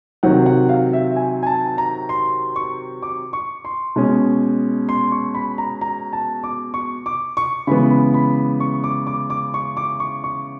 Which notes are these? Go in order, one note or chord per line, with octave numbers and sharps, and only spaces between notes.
C3 D#3 F#3 F#5
F#5
F5
E5
G#5
G#5
A5
A#5
C6
C#6
D6
C#6
C6
B2 G#3 C#4
C6
C#6
B5
A#5
A#5
A5
D6
C#6
D6
C#6
C#3 E3 G#3 B3 B5
B5
B5
C#6
D6
D6
D6
C#6
D6
C#6
C#6